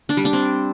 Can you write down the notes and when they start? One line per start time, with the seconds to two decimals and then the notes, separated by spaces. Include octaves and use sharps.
0.09 D4
0.17 G3
0.25 D4
0.33 C4